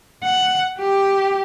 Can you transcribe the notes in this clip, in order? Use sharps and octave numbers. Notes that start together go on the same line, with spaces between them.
F#5
G4